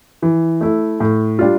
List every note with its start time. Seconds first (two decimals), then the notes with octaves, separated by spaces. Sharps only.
0.22 E3
0.61 A3 E4
1.00 A2
1.39 G3 D4 F4